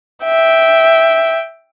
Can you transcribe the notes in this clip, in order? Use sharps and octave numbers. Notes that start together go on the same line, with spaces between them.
E5 G5